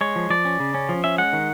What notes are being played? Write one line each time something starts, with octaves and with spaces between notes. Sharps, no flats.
G#3 C#5
F3
F3 D5
C#4
C#3
C#4
F3
C#4 E5
G#3 F#5
D#3